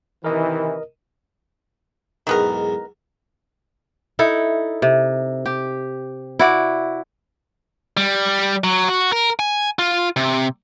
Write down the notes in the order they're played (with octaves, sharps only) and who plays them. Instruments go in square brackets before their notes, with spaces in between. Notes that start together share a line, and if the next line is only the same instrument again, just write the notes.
[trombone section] C3 D#3 E3 [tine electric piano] A#4 D#5
[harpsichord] B1 E2 G#2 [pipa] D#3 B3 A#4
[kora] D#4 E4 A4
C3
G4
E4 F#4 D5
[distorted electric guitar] G3
F#3
F#4
A#4
G#5
F4
C3